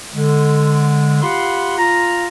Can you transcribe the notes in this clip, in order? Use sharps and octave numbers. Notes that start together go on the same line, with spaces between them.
D3 G#3
F4 G4 F#5 B5 C6
F4 A#5